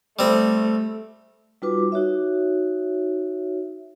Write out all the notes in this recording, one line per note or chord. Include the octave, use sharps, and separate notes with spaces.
G3 A3 C4
G3 D#4 F4 F#4 B4 D6
D#4 F#4 C#5 E5